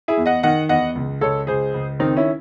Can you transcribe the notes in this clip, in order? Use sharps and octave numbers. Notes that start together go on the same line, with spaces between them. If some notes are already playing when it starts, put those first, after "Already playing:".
E4 G#4
E2
D#5 F#5
D#3 D#5 F#5
E2 D#5 F#5
C#2
C#2 A4 C#5
C#2 G#4 C5
C#2
D#3 C4 D#4
C#4 E4